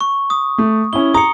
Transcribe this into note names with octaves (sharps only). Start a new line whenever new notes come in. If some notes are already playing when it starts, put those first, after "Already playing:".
C#6
D#6
A3
C#4 E4 G7
A#5 D#6 C#7